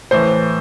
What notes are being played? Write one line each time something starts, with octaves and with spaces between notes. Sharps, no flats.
A2 E3 C5